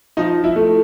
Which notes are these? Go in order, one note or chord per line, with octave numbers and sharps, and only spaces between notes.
F3 D#4 D#5
E4 E5
A3